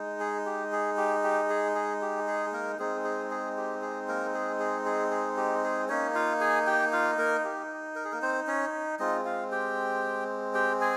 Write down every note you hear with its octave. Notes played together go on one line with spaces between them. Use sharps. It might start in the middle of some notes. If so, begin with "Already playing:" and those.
Already playing: G#3 D#4
G#4
G4
G#4
G4
G4
G#4
G#4
G4
G#4
A#3 A#4
G#3 C4 D#4 G#4
G#4
G#4
G4
G#4
A#3 A#4
G#4
G#4
G#4
G#4
G4
G#4
A#3 C#4 D#4 C#5
F4 F5
G#4 G#5
G4 G5
F4 F5
A#3 A#4
G4
A#4
G#4
A#3 A#4
C4 C5
C#4 C#5
G#3 C4 D#4 F4 D#5
F4 F5
G4 G5
G4 G5
G#4 G#5